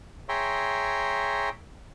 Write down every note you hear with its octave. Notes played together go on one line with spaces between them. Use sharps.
G#4 C#5 E5 G5 A#5 C6